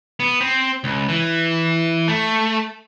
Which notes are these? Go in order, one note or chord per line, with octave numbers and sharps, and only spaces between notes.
B3
C4
C#2
E3
A3